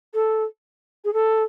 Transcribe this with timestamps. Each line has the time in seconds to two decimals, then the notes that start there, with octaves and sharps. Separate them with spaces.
0.14 A4
1.05 G#4
1.13 A4